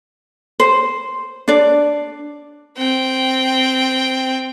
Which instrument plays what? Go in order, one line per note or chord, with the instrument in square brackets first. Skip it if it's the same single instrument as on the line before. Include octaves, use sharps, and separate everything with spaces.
[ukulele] C5
D4 D5
[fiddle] C4 G5